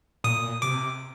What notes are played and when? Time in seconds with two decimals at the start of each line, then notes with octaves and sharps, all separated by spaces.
0.24 A#2 D#6
0.62 C3 D6